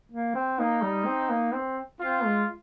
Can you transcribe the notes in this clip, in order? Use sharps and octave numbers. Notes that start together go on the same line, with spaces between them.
A#3
C4
A#3 D#4
G3
C4
A#3
C4
C4 F4
G#3